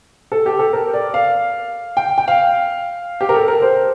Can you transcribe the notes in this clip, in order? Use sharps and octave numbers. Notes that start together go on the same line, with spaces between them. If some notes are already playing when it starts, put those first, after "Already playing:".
A4
G4
A4
A#4
D5
F5
G5
G5
F5
G4
A#4
A4
A#4
C5